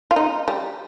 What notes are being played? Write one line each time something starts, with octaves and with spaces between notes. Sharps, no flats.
F4
D#4
G3